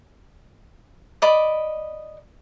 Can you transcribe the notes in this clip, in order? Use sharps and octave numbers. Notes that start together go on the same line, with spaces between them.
D5 D#5 B5 D6